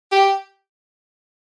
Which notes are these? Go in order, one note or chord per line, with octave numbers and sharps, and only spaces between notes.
G4